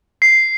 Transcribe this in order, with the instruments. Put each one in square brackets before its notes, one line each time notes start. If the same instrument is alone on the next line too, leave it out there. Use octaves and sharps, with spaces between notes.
[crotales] C7